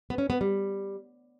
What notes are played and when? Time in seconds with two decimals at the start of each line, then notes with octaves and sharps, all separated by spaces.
0.10 B3
0.18 C#4
0.30 B3
0.41 G3